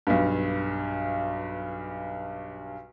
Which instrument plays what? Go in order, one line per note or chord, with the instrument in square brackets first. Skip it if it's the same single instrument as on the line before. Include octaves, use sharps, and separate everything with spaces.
[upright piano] B1 G2